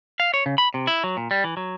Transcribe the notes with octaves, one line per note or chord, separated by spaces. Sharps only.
F5
C#5
C#3
B5
C3
E4
F#3
A#2
G3
E3
F#3